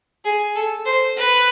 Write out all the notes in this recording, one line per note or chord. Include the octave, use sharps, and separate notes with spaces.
G#4
A4
C5
B4